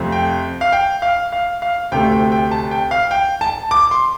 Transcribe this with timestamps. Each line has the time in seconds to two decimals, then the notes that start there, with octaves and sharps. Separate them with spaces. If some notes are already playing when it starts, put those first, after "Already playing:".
Already playing: F2 C3 A3 C4
0.12 G5
0.61 F5
0.72 G5
1.02 F5
1.32 F5
1.62 F5
1.92 D2 C3 A3 G5
2.12 G5
2.32 G5
2.51 A5
2.71 G5
2.91 F5
3.11 G5
3.41 A5
3.71 D6
3.91 C6